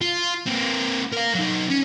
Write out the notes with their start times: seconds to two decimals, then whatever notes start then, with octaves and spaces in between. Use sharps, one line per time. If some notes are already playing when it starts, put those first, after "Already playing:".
0.02 F4
0.46 A#3 C4
1.12 A#4 F5
1.35 F#3 D#4
1.70 C#4